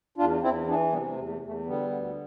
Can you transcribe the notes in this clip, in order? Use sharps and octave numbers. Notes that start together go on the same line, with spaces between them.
E2 D4 F4
E2 C4 E4
E3 B3 D4
C3 G3 B3
A3
E2
A3
E2
A3
D3 G3 B3
D2